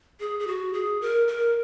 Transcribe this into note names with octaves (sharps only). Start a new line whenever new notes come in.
G#4
G#4
F#4
G#4
A#4
A#4